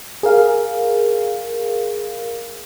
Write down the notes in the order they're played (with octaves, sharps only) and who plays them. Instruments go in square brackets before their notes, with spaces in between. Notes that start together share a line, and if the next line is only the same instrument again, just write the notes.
[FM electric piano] G#4 A#4 F5